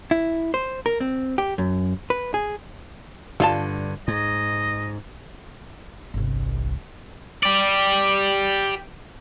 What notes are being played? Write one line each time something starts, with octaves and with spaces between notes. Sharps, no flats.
E4
C5
A#4
C4
G4
F#2
B4
G#4
G2 D3 G3 F4 A5
G#2 D#5
G1 C2
G4 D5